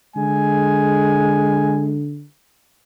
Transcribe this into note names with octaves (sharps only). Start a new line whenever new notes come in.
D3 G#3 G#5